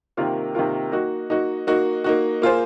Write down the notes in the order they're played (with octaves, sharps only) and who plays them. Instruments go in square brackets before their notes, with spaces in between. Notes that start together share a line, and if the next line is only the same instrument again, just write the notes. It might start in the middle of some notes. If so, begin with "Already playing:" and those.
[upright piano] C3 D#3 A#3 F4 A#4
C3 D#3 A#3 F4 A#4
A#3 D#4 F#4
A#3 D#4 F#4
A#3 D#4 F#4
A#3 D#4 F#4
A#3 F4 G#4 C5